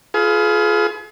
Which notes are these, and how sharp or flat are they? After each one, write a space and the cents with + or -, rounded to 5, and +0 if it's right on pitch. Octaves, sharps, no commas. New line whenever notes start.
F4 +0 G#4 +35 B4 +15